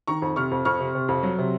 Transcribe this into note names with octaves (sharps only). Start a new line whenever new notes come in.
D#3 A#5 C#6
F2
C3 C#6 F6
F2
F2 C#6 F6
C3
C3
F2
F#3
C3